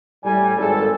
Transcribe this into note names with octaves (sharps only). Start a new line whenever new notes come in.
A2 G3 G#5
G#1 A4